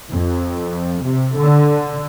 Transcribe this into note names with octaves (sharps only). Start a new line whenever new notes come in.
F2
C3
D3